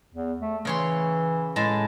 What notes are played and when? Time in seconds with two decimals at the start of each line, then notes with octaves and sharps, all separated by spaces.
0.14 E2
0.42 A3
0.65 C#3 E3 C#5 C6
1.56 A2 G#3 A5